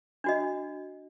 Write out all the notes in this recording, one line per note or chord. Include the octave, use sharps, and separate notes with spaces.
D4 F#4 D#5